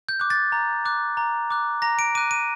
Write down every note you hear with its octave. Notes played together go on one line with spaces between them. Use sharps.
G6
D6 F#6
A6
A#5
D6 F#6
A#5
D6 F#6
A#5 A#6
D7
D6 F#6 D#7
D#7